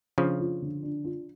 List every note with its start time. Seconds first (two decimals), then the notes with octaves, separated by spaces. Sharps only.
0.18 C#3 F3 D4
0.40 F4
0.62 D3
0.83 D4
1.05 F4